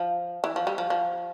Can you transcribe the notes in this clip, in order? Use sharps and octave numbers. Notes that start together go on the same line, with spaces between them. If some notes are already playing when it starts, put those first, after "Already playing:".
Already playing: F3
E3
F3
G3
F3
F3